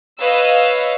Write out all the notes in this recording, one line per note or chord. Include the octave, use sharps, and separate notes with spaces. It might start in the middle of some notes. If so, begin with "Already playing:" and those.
B4 C#5 D#5 F5 E6